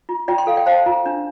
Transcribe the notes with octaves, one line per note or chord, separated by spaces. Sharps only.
F4
F4 D5 G5
G5 C6
A4 F5
D5 G5
C5 F5 A5
F4
D4